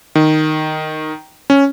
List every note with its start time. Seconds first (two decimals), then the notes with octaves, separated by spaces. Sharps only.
0.15 D#3
1.50 C#4